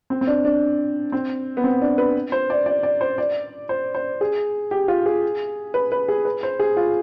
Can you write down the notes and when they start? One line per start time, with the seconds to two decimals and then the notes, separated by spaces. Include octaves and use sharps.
0.10 C4
0.21 C4
0.27 D4
0.45 D4
1.12 C4
1.57 B3
1.64 C4
1.82 D4
1.98 B4
2.32 C5
2.50 D5
2.66 D5
2.83 D5
3.01 C5
3.18 D5
3.69 C5
3.95 C5
4.21 G#4
4.71 G4
4.88 F4
5.06 G#4
5.74 B4
5.92 B4
6.08 G#4
6.25 B4
6.43 C5
6.60 G#4
6.77 F4